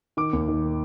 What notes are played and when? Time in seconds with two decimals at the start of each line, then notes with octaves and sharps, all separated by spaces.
0.17 D#3 D6
0.33 D#2
0.48 D#3